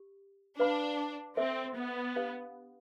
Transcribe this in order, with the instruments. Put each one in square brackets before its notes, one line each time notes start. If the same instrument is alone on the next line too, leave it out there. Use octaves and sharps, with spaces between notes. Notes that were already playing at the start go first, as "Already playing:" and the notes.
Already playing: [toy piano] G4
[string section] D4 [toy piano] B4 F5 B5
[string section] C4 [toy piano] A4 C5 E5
[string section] B3
[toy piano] D4 G4 B4 F5